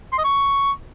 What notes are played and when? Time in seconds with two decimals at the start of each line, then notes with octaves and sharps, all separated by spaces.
0.12 C6
0.18 D#5
0.24 C#6